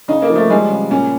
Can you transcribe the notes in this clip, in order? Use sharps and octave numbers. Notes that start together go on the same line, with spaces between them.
C#3 D#4
A#3
F3
A3
G3 G#3
C#3
A#2 C#4